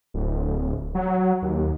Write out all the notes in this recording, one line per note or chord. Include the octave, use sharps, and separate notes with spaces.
D1
F#3
D#2